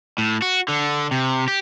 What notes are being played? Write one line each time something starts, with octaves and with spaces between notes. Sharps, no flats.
A2
F#4
D3
C3
G4